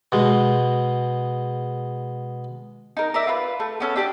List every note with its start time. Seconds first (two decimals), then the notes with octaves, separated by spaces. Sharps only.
0.12 B2 G#3
2.97 D#4 A#4
3.14 A#4 D5 E5
3.27 F4 B4
3.60 A3
3.80 B3 C#4 A4
3.96 D4 G4 D5